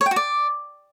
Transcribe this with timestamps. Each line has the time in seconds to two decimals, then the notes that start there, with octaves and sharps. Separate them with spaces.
0.01 C#5
0.06 G5
0.11 F#4
0.16 D5